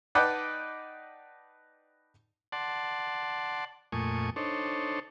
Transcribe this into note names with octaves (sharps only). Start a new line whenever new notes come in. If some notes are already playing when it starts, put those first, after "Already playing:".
D#4 B4 D5 F#5 G5 A5
D5 F#5 A5 C6
F2 A#2 A3 G#5 C#6 D#6
D4 D#4 A4 C5 C#5